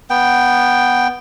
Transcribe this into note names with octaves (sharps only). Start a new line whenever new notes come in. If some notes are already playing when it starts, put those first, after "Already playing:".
B3 G5